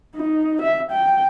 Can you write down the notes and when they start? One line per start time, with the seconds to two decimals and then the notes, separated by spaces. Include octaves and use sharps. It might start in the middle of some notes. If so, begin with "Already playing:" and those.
0.16 D#4
0.62 E5
0.91 G5